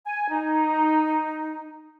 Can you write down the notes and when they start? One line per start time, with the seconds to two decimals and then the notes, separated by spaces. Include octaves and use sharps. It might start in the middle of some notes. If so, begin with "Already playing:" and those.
0.06 G#5
0.29 D#4